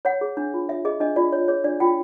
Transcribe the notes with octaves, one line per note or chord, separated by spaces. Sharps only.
C#5 F#5
G#4
D4
F4
C#5 E5
G#4 D#5
D4 D#5
F4 D5
C#5
G#4 C#5
D4 D5
F4 G5